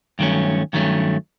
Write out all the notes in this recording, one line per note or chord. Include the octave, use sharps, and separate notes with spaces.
G2 D#3 F#3 A3 C#4
G2 D#3 F#3 A3 C#4